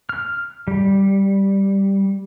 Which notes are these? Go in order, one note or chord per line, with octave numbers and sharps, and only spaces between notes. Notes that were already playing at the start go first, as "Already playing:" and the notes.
F6
G3